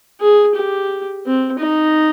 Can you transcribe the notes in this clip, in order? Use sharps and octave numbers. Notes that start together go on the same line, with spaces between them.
G#4
G4
C4
D#4